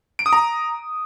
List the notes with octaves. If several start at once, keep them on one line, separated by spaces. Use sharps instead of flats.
D7
D#6
A#5